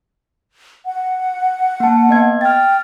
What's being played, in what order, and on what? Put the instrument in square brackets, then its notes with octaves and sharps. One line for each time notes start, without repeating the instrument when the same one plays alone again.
[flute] F#5
[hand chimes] A#3 A5
B3 D#5 G#6
[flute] G5 [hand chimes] F6 A6